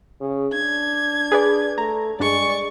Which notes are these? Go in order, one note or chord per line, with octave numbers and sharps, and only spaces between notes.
C#3
D4 G#6
G#4 B4 D5
A3 A#5
G2 G#3 D4 D5 C#6